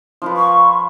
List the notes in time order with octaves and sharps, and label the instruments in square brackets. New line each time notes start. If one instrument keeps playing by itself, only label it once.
[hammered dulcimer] F3 F4 B4
[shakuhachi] C#6